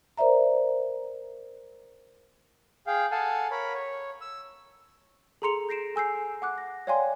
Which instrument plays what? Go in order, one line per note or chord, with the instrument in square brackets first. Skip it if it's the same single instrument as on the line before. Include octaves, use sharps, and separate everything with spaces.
[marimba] A#4 C5 D5 E5 A#5
[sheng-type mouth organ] G#4 F5 G5
A4 F5 F#5 G#5 A5
A#4 C#5 B5
C#5
E6
[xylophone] G#4 A4 A#5 C6 C#7 F7
G6 A#6 C7 D7 E7
A4 G#5 E6 G6 C7
F#5 D6 F#6
A#6
C#5 D5 F5 G5 G#5 C6